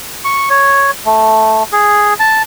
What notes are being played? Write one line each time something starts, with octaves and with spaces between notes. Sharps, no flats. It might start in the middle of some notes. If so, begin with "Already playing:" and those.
C#6
C#5
A3
G#4
A5